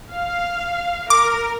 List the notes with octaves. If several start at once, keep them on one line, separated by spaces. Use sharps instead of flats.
F5
A#4 D6